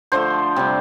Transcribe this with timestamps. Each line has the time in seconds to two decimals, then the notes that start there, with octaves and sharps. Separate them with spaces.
0.12 D3 F3 A3 C5
0.56 C3 G3 D4